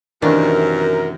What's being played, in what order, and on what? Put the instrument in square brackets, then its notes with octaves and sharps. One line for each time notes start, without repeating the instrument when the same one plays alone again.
[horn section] F#2 [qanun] C3 E3 [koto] D#3 A3 D4 [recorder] A#4